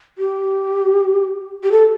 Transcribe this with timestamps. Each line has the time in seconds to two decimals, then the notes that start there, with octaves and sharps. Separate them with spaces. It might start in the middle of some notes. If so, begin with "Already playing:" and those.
0.18 G4
1.63 G4
1.72 A4